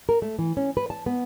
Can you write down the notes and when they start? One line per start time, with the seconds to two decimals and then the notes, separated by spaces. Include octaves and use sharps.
0.09 A#4
0.22 A3
0.39 E3
0.57 C#4
0.77 B4
0.90 A5
1.06 B3